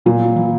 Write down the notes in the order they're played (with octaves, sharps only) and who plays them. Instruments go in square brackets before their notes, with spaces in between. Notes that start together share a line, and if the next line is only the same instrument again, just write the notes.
[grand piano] A#2 [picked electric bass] F#3
[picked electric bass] E3